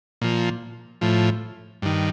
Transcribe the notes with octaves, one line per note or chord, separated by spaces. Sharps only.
A#2 F3
A2 F3
G2 D#3